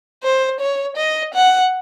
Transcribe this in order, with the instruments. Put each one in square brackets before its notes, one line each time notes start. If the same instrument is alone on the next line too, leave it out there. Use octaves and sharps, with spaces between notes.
[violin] C5
C#5
D#5
F#5